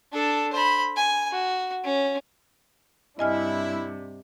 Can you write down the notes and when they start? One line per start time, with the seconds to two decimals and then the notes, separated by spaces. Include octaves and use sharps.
0.12 D4 A4
0.53 C5 B5
0.96 G#5
1.31 F#4
1.84 C#4
3.19 G2 C3 D4 E4 D#5 G#5 F6